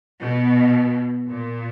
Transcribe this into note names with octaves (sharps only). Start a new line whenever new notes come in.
B2
A#2